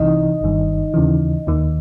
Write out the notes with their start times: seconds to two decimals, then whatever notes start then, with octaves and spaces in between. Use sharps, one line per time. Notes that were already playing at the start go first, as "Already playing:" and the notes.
Already playing: C2 C3 E3 D#4 D#5
0.41 G1 G2 D#3
0.94 D#2 C#3 E3
1.47 D#2 D#3